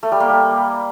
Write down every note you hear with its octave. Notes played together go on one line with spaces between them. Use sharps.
A3
G3
A#3
G3